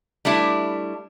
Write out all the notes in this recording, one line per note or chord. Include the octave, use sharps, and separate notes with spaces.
G3 A3 D4 E4